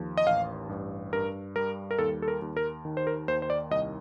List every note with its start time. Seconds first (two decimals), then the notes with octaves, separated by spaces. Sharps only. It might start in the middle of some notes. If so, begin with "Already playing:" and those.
Already playing: D#2 F3
0.17 D#5
0.27 A1 F5
0.69 G2
1.13 G2 A#4
1.56 G3 A#4
1.91 A#4
1.99 D#2 A4
2.22 A4
2.28 A#4
2.42 D#2
2.57 A#4
2.85 D#3
2.97 C5
3.07 A#4
3.28 D#2 C5
3.42 C5
3.50 D5
3.71 C2 D#5